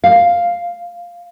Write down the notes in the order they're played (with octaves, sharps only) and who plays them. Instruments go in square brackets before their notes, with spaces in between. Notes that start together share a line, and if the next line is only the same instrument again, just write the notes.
[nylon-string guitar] F5